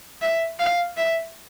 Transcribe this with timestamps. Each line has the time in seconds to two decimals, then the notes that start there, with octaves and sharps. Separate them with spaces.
0.21 E5
0.59 F5
0.97 E5